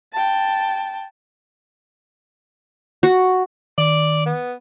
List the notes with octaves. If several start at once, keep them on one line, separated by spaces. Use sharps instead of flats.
G5 A5
F#4
D#3 D5
B3